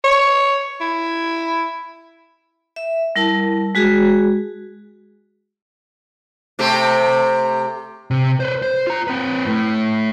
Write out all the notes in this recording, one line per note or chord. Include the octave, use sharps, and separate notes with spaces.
C#5
E4
E5
G3 E4 A#4 A5
G#3 F#4 G#4
C3 A3 G4
C3
B4 C5
C5
F4 A#5
C4 B4
A2